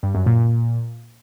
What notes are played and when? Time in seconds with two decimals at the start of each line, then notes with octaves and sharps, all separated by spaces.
0.03 G2
0.15 F#2
0.26 A#2